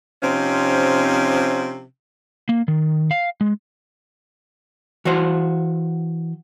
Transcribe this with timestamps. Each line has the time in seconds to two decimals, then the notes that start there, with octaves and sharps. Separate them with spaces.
0.22 C3 F3 C4 C#4 D#4
2.49 A#3
2.68 D#3
3.11 F5
3.41 G#3
5.05 E3 F#4 C5